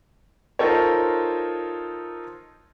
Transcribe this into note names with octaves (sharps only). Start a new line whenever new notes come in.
D#4 F4 A4 A#4 C5 C#5